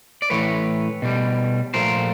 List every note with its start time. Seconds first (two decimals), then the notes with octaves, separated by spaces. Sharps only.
0.22 D5
0.30 A2 E3 A3 B4 C#5
1.02 B2 G3
1.74 A#2 F3 A3 A#4 C5